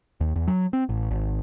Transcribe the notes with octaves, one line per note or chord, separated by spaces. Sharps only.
D#2
E2
F#3
C4
A1
G#1